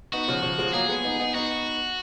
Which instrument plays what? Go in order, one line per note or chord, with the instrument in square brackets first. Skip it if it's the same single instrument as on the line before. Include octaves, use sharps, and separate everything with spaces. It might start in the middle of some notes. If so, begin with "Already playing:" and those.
[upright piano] B3 D#4 [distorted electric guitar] F#4
[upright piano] C#3 F3
C#3 F3
F3 G#3
[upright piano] F#3 A#3 [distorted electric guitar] G#4
[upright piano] G#3 B3
B3 D#4
B3 D#4
[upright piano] B3 D#4 [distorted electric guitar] F#4